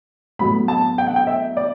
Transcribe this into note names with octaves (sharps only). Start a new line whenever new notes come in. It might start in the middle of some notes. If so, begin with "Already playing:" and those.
A2 F#3 B3 B5
A5
G5
F#5
G5
E5
D5